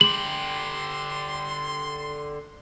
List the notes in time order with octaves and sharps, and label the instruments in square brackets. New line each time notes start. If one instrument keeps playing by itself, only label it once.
[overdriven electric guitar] D3 G4 [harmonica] C6 [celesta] F#7